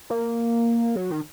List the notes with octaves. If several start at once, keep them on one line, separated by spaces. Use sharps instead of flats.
A#3
F#3
D#3